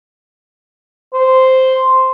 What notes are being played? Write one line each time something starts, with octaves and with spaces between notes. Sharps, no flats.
C5